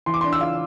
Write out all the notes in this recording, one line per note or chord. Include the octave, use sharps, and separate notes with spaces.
E3 C6
D6
D4 C6
E6
F4